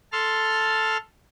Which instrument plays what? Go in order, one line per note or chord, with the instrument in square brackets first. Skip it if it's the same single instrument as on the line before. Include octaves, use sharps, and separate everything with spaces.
[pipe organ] A4 A5 C6 F6